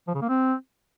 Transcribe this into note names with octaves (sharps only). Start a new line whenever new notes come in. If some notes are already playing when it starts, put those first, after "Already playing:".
F3
C#3
A#3
C4